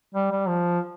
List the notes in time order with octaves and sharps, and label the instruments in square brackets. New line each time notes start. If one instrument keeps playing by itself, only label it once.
[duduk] G3
G3
F3